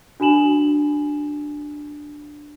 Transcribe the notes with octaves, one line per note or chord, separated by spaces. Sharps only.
D4 F#4 G#5 E7 F#7